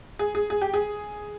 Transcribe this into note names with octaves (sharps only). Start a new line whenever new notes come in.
G#4
G#4
G#4
G4
G#4